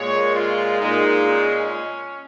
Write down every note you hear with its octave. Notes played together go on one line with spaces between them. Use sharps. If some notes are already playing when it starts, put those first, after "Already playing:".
Already playing: A#2 G#3 C#5
F4
A#2 G#3 D#4
C#4